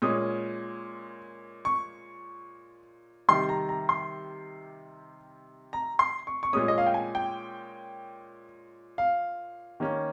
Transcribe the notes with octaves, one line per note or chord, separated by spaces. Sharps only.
A#2 G#3 C#4 D#6
C#6
C3 D#3 G3 C6
A#5
A#5
C6
A#5
C6
C#6
C#6
A#2 G#3 C#4 D#6
D#5
F5
G5
G#5
G5
F5
D#3 A#3 C#4